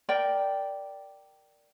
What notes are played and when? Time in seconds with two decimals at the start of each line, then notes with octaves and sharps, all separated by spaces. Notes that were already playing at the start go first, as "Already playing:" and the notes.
0.09 A#4 D5 G5